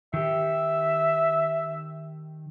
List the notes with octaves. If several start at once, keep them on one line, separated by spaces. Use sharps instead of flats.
D#3 G4 E5